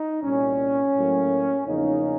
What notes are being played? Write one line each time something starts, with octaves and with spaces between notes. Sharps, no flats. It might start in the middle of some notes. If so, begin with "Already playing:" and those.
Already playing: D#4
C2 A#2 G3 C#4
A2 F#3 A#3
E2 C#3 F3 A#3 C#4 D#4